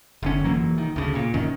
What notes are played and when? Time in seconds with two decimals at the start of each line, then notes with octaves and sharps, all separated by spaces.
0.23 F#1 D3 C#4
0.44 F1 E3 F#3 A#3
0.78 D#3
0.96 D2 C#3
1.15 A#2
1.34 F#2 A#2 D#3 C#4